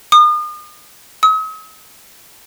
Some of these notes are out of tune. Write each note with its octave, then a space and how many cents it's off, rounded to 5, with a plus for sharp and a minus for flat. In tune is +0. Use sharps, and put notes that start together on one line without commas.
D#6 -40
D#6 +45